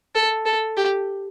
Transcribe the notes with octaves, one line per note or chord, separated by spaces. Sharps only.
A4
A4
G4